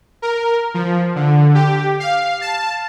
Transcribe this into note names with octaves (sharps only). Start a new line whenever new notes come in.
A#4
F3
D3
G4
F5
A5